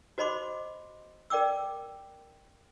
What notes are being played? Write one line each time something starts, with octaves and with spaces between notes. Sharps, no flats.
F#4 C5 D#5 B5 C6 D6
A#4 D5 G5 D6 E6